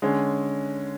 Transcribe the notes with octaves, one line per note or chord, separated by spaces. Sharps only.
D3 G#3 C#4